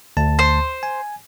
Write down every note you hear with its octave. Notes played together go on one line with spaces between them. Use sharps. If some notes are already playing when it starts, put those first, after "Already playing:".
D2 A5
C5
G#5